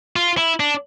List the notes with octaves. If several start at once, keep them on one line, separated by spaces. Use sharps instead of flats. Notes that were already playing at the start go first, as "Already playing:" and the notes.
F4
E4
D4